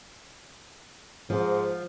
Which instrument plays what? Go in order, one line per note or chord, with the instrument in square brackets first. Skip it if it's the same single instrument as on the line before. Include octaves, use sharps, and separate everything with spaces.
[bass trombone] G#2 [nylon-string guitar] F3